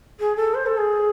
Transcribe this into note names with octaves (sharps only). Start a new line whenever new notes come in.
G#4
A4
C5
A4
G#4